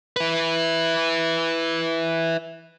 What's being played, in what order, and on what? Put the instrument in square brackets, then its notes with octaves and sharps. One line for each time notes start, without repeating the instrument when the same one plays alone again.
[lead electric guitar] E4 B4